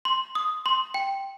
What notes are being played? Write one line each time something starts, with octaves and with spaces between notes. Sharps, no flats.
C6
D#6
C6
G5